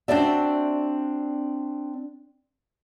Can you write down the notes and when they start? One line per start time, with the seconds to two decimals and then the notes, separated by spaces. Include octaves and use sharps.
0.08 C4 D4 F#4 D5 E5